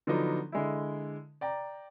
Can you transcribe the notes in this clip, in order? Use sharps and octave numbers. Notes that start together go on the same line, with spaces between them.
D3 F3 F#3 B3 D4 D#4
D3 G#3 E4
D5 G5 A#5